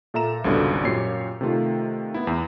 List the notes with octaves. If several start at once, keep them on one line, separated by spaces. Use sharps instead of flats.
A#2 A4 E5 A#5 E7
G#1 C#2 B2 D3 G3
F#2 A#2 G4 C#5 C7
C3 D#3 A3 F4
B3 E4
E2